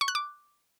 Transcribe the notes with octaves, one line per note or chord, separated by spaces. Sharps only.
C#6
F#6
D6